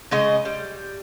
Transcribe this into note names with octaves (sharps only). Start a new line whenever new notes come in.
C#3 G#3 D#5
G3